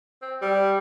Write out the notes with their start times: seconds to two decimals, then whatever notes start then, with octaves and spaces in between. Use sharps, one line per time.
0.22 C4
0.42 G3